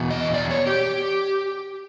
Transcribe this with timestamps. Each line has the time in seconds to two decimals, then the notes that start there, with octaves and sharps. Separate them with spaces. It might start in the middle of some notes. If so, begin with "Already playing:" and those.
Already playing: E2 B2
0.10 D#5
0.34 D5
0.50 C#5
0.67 G4